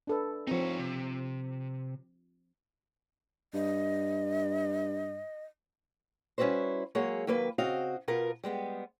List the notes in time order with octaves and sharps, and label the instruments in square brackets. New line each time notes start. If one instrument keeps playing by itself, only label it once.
[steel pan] D4 A4 B4
[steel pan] F3 C4 [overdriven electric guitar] D#4 C#5
[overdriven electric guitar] C3
[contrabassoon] G2 [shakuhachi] D#5
[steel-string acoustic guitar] G3 C#4 E4 F#4 B4 C5
F#3 G#3 A#3 G#4 C#5
D#2 F#3 A#3 B4
C#3 C4 F#4 D#5 F5
B2 B3 F4 A#4
G3 G#3 B3